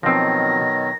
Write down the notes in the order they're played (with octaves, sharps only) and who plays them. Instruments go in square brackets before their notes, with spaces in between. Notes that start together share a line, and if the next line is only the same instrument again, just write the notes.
[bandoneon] B2 D#3 F#3 [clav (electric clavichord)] F3 C4 [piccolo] A#6